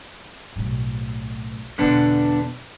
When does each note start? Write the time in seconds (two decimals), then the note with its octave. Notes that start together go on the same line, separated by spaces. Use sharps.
0.56 B1 A2
1.78 E2 B2 D3 B3 D4